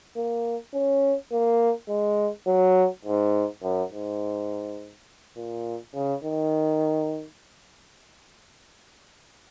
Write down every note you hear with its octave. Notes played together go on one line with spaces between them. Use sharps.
A#3
C#4
A#3
G#3
F#3
G#2
F#2
G#2
A#2
C#3
D#3